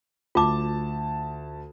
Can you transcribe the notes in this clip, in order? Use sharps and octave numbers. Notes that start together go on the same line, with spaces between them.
D2 F4 A5 D6